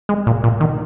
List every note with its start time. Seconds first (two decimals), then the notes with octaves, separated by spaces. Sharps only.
0.09 G#3
0.27 A#2
0.44 A#2
0.60 D#3